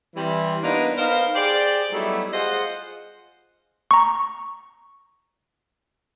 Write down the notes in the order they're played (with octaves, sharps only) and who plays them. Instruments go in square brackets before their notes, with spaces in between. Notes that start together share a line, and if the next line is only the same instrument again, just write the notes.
[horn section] E3 G3 C4
A#3 B3 D4 D#4 F4 B4
B3 D#4 A#4 C5 F5
G4 G#4 C5 D5
F#3 G3 A3 B3 D#4 E4
F4 G#4 C5 D#5 F5 F#5
[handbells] A#5 C#6